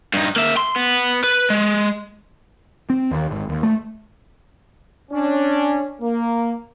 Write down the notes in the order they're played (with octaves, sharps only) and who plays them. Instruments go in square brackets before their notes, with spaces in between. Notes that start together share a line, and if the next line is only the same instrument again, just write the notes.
[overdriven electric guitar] G2 D#4
A#3 E5
C6
B3
B4
G#3
[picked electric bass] C4
D#2
G#1
D#2
A3
[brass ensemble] C#4 D4
A#3